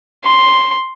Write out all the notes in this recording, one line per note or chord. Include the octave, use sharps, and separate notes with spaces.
C6